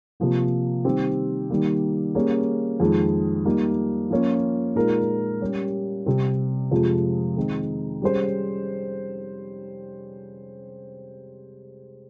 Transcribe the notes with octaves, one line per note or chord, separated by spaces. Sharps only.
C3 F3 A#3
D#3 G3 C4 G4
D#3 G3 A#3
G3 A#3 C#4 G#4
F2 D#3 G#3
G3 A#3 D#4
F3 A#3 C#4 F4
A#2 G#3 D#4 A#4
G3 C#4 G4
C3 G3 C4
F2 C3 F3 G#3
D#3 G#3 C4 D#4
G3 C#4 G#4 C5